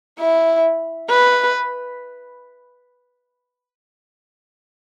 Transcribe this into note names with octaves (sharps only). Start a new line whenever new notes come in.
E4
B4